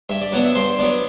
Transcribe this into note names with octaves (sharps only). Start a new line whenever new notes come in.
G2 E5
D5
F#3 B3 D4 F#5
E5
G2 C5
F#3 B3 D4 D5